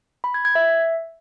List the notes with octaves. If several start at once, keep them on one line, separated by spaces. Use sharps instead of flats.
B5
G#6
G#6
E5